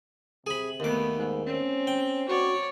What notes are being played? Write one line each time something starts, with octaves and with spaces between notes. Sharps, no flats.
C3 G#4 B5
D#2 A3 B3 D6
G#2
C4 C#4
G5
F#4 C#5 D5